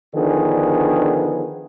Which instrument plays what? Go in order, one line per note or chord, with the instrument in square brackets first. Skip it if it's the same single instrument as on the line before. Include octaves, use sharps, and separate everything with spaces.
[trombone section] D3 D#3 F3 B3 D4 G#4